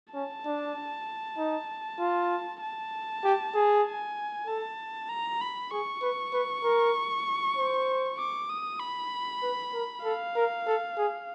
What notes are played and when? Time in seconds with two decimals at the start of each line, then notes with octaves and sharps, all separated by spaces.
0.14 C#4 A5
0.46 D4
1.38 D#4
2.00 F4
2.62 A5
3.24 G4
3.54 G#4
3.85 G#5
4.47 A4 A5
5.09 A#5
5.41 B5
5.71 G#4 C#6
6.02 B4
6.33 B4
6.63 A#4
7.57 C5
8.19 D6
8.50 D#6
8.80 B5
9.42 B4
9.74 A#4
10.04 A4 F5
10.35 A#4
10.67 A4
10.97 G#4